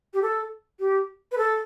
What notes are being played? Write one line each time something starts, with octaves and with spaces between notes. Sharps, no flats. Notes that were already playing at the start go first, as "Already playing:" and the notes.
G4
A4
G4
B4
A4